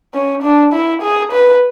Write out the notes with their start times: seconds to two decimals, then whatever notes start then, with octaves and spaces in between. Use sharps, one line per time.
0.14 C#4
0.43 D4
0.73 E4
1.02 G#4
1.32 B4